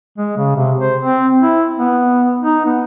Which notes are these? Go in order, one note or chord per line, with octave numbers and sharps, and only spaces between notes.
G#3
C#3
C3
C5
C4
E4
B3
D#4
B3